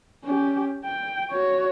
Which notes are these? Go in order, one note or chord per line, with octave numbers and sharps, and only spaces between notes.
C#4 G4
G5
F#4 C#5